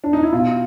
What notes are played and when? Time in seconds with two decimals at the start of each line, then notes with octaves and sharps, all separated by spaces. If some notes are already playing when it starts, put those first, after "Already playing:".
0.04 D4
0.13 D#4
0.23 E4
0.33 B2 F4